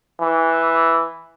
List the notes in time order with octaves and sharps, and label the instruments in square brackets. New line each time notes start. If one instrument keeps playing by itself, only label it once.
[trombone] E3